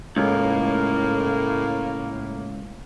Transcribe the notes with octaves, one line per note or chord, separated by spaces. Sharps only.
C#2 A2 A#3